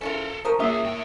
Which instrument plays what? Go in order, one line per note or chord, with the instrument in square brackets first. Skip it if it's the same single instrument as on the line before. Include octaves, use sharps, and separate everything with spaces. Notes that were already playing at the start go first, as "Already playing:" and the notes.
[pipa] C#4 E4 F4 [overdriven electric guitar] A4 A#4
[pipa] F3 A#4 C5 [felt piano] C#6 D#6
[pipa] C3 [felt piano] A#3 C#5 [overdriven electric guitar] F4 G#4 [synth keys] E5 D#6
[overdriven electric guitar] A2 G5